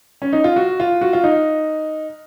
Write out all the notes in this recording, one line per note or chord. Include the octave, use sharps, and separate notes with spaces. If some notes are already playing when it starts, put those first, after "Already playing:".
C#4
D#4
F4
F#4
F4
F#4
F4
D#4